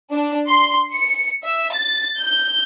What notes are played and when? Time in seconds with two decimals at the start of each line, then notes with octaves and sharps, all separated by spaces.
0.13 D4
0.49 C6
0.95 C#7
1.45 E5
1.75 A6
2.19 G6